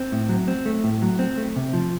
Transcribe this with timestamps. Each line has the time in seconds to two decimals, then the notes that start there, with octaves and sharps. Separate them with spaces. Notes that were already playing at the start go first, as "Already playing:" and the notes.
Already playing: C4
0.12 A2
0.29 F#3
0.48 C4
0.66 A3
0.84 A2
1.02 F#3
1.19 C4
1.37 A3
1.56 C3
1.73 F3